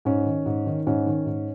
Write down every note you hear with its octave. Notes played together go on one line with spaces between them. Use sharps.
G#2 C#4
D#3
G#2
D#3
G#2 C#4
D#3
G#2